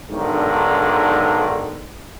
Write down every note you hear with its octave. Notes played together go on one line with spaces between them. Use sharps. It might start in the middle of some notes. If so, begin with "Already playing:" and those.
B1 G#2 D3 D#3 D4